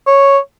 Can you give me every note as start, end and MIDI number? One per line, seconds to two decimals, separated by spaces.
0.07 0.38 73